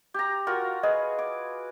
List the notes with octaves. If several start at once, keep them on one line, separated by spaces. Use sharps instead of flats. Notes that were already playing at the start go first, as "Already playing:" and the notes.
G4 A#5
F4 F#4 A#4
G#4 B4 D#5
D6